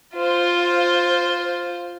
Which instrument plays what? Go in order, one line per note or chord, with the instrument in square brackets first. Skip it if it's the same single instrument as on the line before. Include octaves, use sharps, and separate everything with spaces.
[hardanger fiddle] F4 C5